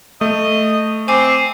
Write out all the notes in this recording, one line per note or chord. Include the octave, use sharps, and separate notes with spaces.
A3 D#5
C4 G#5 D6 C7